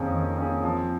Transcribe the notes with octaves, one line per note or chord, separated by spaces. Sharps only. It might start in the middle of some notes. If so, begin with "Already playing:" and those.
Already playing: F2 D#3 A#3 C#4 G#4
D#3
A#3 C#4 G#4
F3